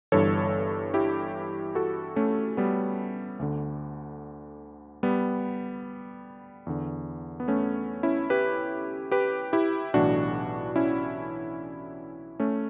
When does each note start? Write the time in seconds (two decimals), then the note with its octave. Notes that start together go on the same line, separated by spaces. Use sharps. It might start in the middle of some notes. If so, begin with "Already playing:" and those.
0.12 G1 G2 E3 A4 C#5
0.94 E4 G4
1.75 F#4 A4
2.16 A3 C#4
2.57 G3 B3
3.39 D2 D3
5.03 G3 B3
6.67 E2 D3
7.40 B3
7.48 A3 C#4
8.03 C#4 E4
8.30 G4 B4
9.12 G4 B4
9.53 E4 G4
9.94 B1 A2 E3 D4 F#4
10.76 C#4 E4
12.40 A3 C#4